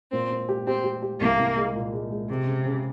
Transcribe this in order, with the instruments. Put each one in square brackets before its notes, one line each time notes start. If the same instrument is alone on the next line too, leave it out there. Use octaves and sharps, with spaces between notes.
[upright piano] A#2 [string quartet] C4
[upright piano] C4
G4
[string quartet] C4 [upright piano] G4
[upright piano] G4
G4
[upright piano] C2 [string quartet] A#3
[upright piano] C2
G#3
A#2
G#3
G#3
[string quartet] C3 [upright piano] G#3
[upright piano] C#3
C#3